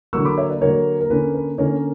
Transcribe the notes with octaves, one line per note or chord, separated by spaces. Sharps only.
D3 F#3 A#3 C#6 E6
B5 D6
C#5 E5
B4 D5
D3 F#3 A#3 A#4 C#5
A#4
D3 A#3 C#4 B4
B4
D3 A#3 C#4 A#4 C#5